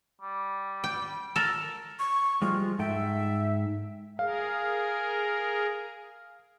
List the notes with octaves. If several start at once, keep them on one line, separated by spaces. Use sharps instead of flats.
G3
G5
A4 A#4
C#6
F3 G3 G#3 F4
G#2 A4 E5 G5
G#4 A#4 F5